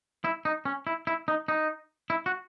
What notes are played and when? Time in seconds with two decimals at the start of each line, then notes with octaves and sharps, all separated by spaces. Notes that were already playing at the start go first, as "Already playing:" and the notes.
0.25 E4
0.45 D#4
0.65 C#4
0.87 E4
1.07 E4
1.28 D#4
1.48 D#4
2.10 E4
2.26 F#4